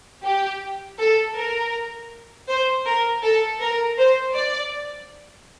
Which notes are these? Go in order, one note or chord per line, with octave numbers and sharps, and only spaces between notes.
G4
A4
A#4
C5
A#4
A4
A#4
C5
D5